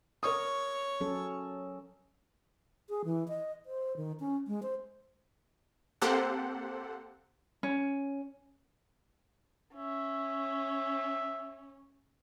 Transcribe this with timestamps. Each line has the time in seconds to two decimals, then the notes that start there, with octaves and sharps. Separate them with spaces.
0.23 A#4 C#5 C#6 D#6
1.01 F#3 C#4 A4
2.89 G#4
3.05 E3
3.28 D#5
3.66 C5
3.97 D#3
4.20 C#4
4.47 G#3
4.63 C5
6.02 A#3 C4 G4 A4 C5 F#5
7.63 C#4
9.75 C#4 E5